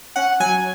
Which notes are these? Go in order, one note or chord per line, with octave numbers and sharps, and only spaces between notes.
C#4 F#5
F#3 G#5